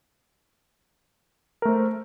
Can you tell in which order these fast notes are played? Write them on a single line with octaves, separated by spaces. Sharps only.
A#4 A3 C5